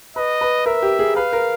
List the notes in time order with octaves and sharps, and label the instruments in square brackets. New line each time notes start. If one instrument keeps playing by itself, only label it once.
[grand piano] B4 [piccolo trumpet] D#5
[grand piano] B4
[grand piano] A#4 [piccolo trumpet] E5
[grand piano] G4
G#4
[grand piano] B4 [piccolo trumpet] F5
[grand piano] A#4